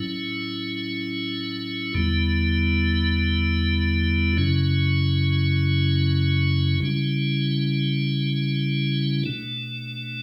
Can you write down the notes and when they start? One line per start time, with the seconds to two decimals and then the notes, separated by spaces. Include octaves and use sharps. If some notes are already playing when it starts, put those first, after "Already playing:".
Already playing: A2 F#3 C#4 E4
1.94 E2 D3 G3 B3 E4
4.37 F#2 C#3 F#3 C#4 E4
6.81 C#3 G3 C#4 E4
9.23 B2 A3 D4